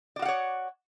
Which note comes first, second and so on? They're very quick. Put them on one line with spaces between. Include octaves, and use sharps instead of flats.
D5 F#4 F5 F#5 C#5